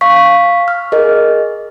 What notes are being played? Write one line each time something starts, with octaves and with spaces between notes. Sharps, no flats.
F5 C#6 B6
F6
G#4 A#4 D#5